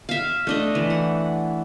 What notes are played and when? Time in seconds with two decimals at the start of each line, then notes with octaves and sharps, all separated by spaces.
0.09 E5 F5
0.47 A3 D4 D#5
0.75 E3
0.90 F#5